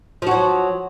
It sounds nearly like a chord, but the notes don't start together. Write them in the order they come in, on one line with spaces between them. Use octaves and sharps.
F3 F#4 F#3